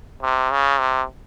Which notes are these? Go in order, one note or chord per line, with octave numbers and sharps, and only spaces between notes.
C3
C#3
C3